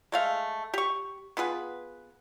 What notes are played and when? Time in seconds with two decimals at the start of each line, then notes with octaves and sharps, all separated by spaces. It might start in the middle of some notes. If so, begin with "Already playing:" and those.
0.12 G#3 A3 F5
0.74 G4 C#6
1.37 B3 F4 G#4 B4